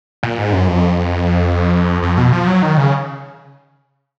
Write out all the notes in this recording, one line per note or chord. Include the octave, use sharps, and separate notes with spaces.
A#2
G#2
F#2
F2
F2
B2
F3
F#3
D#3
C#3